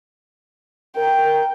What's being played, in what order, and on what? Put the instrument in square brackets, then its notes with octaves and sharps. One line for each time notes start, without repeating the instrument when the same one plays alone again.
[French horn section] A#4 [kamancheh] G5